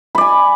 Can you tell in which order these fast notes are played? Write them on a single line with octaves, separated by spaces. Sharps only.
B5 D5 G#5